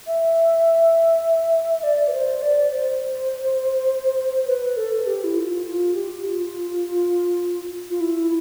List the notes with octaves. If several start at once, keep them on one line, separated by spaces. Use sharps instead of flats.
E5
D5
B4
C5
D5
C5
B4
A4
G4
E4
F4
F4
G4
F4
F4
E4